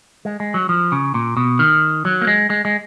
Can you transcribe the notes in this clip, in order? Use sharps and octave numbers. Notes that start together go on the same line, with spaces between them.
G#3
G#3
F#3
F3
C#3
A#2
B2
D#3
F#3
A#3
G#3
G#3
G#3